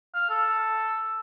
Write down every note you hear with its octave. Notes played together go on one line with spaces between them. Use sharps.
F5
A4